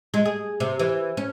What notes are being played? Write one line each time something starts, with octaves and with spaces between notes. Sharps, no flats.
G#3
G#4
C3
E3
C#4